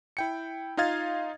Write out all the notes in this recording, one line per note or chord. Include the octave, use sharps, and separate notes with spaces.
E4 G5 C#7
D#4 F4 D#5 F5 G#6 A6